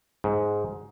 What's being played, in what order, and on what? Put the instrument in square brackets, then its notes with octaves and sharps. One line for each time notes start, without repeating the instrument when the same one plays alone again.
[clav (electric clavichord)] G#2